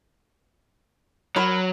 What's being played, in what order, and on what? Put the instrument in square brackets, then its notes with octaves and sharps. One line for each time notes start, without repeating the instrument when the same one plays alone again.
[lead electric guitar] F#3 [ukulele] A#4 C#5 B5